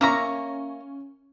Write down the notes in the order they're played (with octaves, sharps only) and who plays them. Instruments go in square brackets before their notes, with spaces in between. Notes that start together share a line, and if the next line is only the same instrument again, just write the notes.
[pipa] A#3 E5 A#5 [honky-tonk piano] C#4 C#6